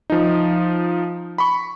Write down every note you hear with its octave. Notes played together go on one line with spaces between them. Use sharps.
F3 D#4
B5 C#6